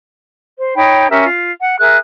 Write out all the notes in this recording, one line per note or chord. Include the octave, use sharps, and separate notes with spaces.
C5
D#4 C#5 G5 B5
C#4 G4 A#4 E5
F4
F#5
G#4 A#4 E5 F#6